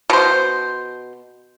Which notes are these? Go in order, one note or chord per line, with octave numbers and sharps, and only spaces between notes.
B2 C5